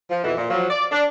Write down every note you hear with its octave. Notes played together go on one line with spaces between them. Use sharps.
F3
F2 B2 E3
A#2
F3 F#3
D5
D4